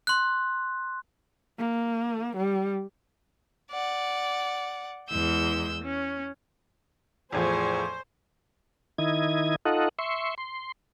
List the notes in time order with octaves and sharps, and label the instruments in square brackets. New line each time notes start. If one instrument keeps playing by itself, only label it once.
[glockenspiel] C6 F#6
[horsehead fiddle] A#3
G3
[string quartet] D5 F#5
E2 G#3 E6 G6
C#4
[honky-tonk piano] E2 A2 F3 [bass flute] G#4 [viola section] C5 [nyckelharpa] G#5 C#6
[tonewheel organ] D#3 E4 D#5 G#6
D#4 F4 A4 D#5 F#5
E5 C6 C#6
C6